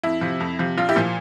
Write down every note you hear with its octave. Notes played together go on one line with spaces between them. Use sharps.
F2 E4
C3 F3
F2
C3 F3
A#1 F4
E4 G4
A#2 F3